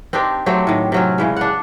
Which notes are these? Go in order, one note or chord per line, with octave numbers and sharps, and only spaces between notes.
C4 D4 D#4 G4
F#3 A3 C4 G4
A2 D#3
C3 F#3 C#4
C#3 E3 G#3
D4 F#5